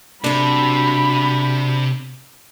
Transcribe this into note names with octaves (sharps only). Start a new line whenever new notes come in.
C3 D4 F#4 A4 B5